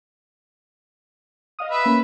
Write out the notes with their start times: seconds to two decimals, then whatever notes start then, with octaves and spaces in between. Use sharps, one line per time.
1.59 D#5 F5 D#6
1.71 B4 E5
1.86 A#3 C#4